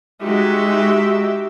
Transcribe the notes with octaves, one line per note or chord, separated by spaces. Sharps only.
G#3 D#4 F#4 G4 E5